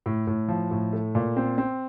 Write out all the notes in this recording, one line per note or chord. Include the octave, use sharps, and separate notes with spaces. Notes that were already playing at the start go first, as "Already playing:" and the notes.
A2
A2
F3
A2
A3
A#2
C4
C4